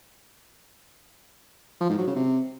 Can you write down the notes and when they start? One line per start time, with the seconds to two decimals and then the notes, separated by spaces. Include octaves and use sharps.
1.81 F3
1.89 G#2
1.98 F#3
2.07 C#3
2.16 C3